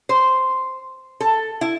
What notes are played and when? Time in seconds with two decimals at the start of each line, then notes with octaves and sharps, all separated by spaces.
0.09 C5
1.20 A4
1.61 E4